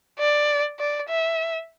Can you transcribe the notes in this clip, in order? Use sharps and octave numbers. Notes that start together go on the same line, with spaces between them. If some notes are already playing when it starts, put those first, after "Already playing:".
D5
D5
E5